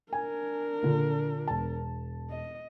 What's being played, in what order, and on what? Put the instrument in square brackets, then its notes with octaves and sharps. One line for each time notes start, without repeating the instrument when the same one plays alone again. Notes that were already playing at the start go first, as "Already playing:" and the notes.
[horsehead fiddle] D4 A#4 [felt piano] G#5
[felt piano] A#2 D3
E1 A5
[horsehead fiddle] D#5